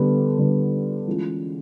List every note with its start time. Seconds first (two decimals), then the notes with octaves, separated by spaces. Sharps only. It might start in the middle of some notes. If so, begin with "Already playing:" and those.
Already playing: D3 G3 B3
0.39 D3 G3 B3
1.07 E3 G#3 C#4 F4